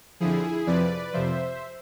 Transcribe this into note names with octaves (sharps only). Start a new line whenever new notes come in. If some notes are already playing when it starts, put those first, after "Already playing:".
F2 D3 F3 E4 G#4
F2 C3 F3 B4 D5
F2 C3 F3 C5 E5